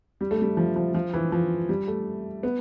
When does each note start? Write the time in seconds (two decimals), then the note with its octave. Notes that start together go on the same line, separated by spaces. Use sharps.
0.21 G3
0.31 A3
0.42 G3
0.57 F3
0.76 F3
0.95 F3
1.14 E3
1.32 F3
1.69 G3
1.88 A3
2.43 B3